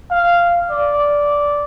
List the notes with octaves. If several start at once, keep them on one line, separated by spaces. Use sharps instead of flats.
F5
D5